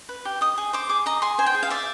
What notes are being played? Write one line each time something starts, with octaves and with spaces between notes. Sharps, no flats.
B4
G4
D#5 D#6
G#4
C5 D6
G#4 D6
D#5 A#5
G#4 C6
C5 G#5
G5
G#4
F5
D5 E5